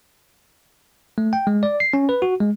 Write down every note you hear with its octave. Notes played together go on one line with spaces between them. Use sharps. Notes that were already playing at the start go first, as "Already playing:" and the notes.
A3
G5
G#3
D5
C7
C#4
B4
F#4
G#3